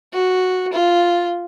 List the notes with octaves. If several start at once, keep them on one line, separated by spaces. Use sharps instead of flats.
F#4
F4